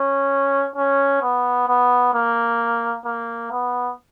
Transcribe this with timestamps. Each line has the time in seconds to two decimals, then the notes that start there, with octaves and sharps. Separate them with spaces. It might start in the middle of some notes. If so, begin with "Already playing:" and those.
Already playing: C#4
0.76 C#4
1.22 B3
1.68 B3
2.14 A#3
3.05 A#3
3.51 B3